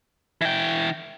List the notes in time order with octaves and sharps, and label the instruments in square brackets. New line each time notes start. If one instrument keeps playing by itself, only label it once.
[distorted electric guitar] E3 G5